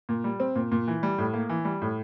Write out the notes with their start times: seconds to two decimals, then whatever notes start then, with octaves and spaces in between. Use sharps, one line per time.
0.09 A#2
0.24 G3
0.40 C4
0.56 A#2
0.72 A#2
0.88 E3
1.03 G3
1.18 A2
1.33 A#3
1.49 E3
1.65 G3
1.82 A2